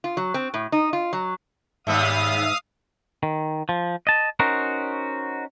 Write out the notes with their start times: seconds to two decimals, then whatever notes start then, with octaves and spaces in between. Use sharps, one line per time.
0.04 F4
0.17 F#3
0.34 C4
0.54 A2
0.72 D#4
0.93 F4
1.13 F#3
1.87 D#2 G#2 G3 B3 E5 F5 D#6
3.23 D#3
3.69 F3
4.07 D#5 A5
4.40 C#4 D#4 F#4 A#4 C5